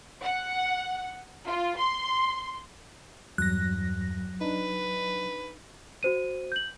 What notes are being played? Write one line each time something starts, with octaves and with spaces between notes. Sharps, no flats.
F#5
F4
C6
E2 G2 F#3 F#6 A#6
D4 D#4 B4
F#4 C5 D#7
G6 F#7